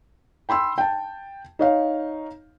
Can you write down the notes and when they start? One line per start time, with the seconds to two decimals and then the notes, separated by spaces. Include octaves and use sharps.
0.49 G5 B5 C6 E6
0.78 G5 A5
1.59 D#4 C#5 F5